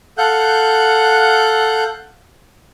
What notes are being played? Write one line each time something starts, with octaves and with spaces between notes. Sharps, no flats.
A4 F5 F#5 F#6 G6